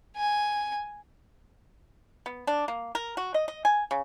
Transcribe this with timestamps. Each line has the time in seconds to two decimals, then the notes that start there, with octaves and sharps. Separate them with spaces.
0.17 G#5
2.26 B3
2.47 D4
2.68 A#3
2.95 A#4
3.17 F#4
3.34 D#5
3.48 D#5
3.65 G#5
3.91 C#3